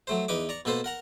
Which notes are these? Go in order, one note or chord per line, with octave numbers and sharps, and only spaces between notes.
F#3 A3 C5
E2 D#4 B4 D6
D5 A#5 C#6
B2 A#3 A4 B4 C5
A#4 F#5 A#5